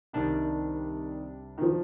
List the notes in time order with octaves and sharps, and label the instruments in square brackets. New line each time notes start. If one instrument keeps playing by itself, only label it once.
[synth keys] C2 C3 G3 D4 [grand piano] D#3
[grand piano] D#3
F3